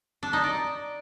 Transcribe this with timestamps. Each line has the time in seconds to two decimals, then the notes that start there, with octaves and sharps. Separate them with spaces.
0.23 D4
0.33 D#4
0.44 D5